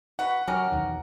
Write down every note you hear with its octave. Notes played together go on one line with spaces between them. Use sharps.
F#4 B4 F#5
F#3 C#4 G4 A#4
B1 E2 D#3